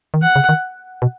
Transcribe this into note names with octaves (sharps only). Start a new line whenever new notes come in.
D#3
E3 F#5
C#3
D#3
B2